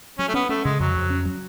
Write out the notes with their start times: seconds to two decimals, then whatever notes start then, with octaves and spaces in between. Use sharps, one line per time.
0.19 F#3 C#4
0.28 A3
0.34 B3 C#4
0.49 A3 C#4
0.64 C#3 G#3
0.80 F2 F#3
0.96 F2
1.10 C#4
1.26 F#3